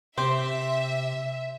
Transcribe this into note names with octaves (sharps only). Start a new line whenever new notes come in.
C3 C4 G4 C5 E5 C6